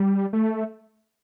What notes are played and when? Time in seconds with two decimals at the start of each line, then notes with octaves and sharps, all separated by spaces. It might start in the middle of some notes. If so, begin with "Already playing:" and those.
Already playing: G3
0.33 A3